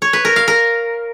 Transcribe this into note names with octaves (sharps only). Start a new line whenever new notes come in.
C#5
B4
A#4
F5
A#4